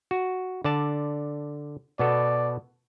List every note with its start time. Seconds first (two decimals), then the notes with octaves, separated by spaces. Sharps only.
0.11 F#4
0.64 D3 D5 A5
1.99 B2 B3 A4 D5